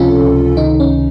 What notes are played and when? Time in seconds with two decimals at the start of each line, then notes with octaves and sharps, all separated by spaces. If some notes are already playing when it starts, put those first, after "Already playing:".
Already playing: C#2 C3 F3 C#4 F4 A4
0.23 C#2
0.56 D#3 D#4
0.80 C#4